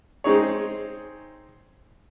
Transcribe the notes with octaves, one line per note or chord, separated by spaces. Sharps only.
G#3 C4 D#4 G#4 C#5